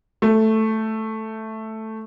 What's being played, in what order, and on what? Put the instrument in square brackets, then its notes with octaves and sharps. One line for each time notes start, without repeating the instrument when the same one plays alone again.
[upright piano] A3